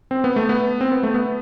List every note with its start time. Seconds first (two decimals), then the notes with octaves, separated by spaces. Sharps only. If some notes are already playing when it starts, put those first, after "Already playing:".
0.11 C4
0.24 B3
0.36 A3
0.49 B3
0.81 C4
0.92 B3
1.03 A3
1.14 B3